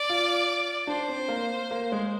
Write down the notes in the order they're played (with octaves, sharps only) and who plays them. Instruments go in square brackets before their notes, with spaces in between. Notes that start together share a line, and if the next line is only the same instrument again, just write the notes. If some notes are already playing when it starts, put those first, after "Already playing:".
Already playing: [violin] D5
[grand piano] F4
[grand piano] D4 [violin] C5
[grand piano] C4
A#3
A#3
G#3